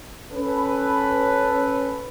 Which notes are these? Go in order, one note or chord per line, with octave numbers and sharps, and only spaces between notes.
C#4 A4 B4